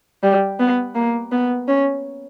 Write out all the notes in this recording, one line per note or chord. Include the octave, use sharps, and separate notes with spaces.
G3
B3
A#3
B3
C#4